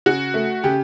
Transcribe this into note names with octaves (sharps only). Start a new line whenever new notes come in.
C#3 F#4
A3
C#3 G4